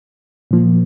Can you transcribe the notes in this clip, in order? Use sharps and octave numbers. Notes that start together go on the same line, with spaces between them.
A#2 F3 A#3